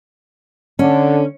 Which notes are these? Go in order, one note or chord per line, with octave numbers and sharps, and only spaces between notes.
D3 C#4